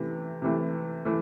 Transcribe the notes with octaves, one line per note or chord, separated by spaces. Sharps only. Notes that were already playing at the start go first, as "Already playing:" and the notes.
Already playing: C3 E3 A3
C3 E3 A3
E3 A3